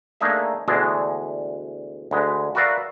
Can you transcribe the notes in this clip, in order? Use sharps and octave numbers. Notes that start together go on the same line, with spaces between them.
A3 A#3 D4 D#4 G#4 E5
D2 B2 E3 G#3 D4
D2 G#3 B4
F#4 A#4 B4 D5 E5 F5